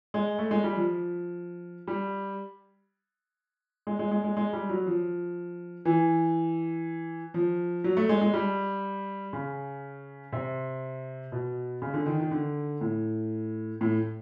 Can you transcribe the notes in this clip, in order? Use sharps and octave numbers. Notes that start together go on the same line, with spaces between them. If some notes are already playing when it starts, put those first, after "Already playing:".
G#3
A3
G#3
G3
F3
G3
G#3
G#3
G#3
G#3
G#3
G3
F#3
F3
E3
F3
F#3
A3
G#3
G#3
G3
C#3
C3
B2
C#3
D3
D#3
D#3
D3
A2
A2